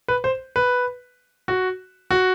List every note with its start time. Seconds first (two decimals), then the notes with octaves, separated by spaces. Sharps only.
0.08 B4
0.24 C5
0.56 B4
1.48 F#4
2.11 F#4